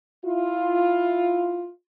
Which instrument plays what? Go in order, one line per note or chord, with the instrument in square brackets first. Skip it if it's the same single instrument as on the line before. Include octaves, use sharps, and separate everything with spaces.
[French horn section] E4 F4